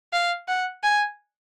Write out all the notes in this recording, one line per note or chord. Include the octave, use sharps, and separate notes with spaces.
F5
F#5
G#5